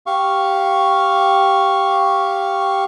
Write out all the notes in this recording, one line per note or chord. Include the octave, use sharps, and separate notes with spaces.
G4 F5 C#6